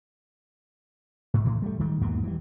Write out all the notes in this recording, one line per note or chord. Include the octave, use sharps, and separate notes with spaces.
G#2
A2 E3
G3 A3
D#3 G3 G#3
E2 G#2 B2 A#3
E3 G3